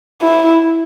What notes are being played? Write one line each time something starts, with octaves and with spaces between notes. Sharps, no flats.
E4